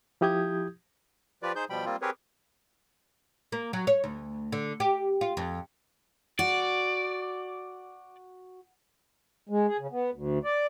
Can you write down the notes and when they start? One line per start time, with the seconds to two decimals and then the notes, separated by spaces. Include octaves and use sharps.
0.21 F3 E4 G4 D#6 G6 G#6
1.43 F3 F4 G4 B4 D5
1.56 D#4 G#4 C5 G6
1.70 B2 F3 G3 G5 B5
1.85 G3 A#3 C4 F4
2.02 C4 G4 G#4 A#4 B4 C#5
3.52 A#3
3.73 F#3
3.87 C#5
4.04 D2
4.52 D3
4.80 G4
5.21 F4
5.37 F2
6.39 F#4 D5
9.49 G#3
9.68 G#4
9.79 C#3
9.92 B3
10.13 D2
10.44 D5